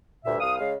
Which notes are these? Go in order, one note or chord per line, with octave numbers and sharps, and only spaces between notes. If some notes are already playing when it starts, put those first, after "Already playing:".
D2 G2 A#2 E5
C2 F5 D#6
C#3 G#3 F5